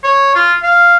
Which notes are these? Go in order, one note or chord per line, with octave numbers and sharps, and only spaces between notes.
C#5
F4
F5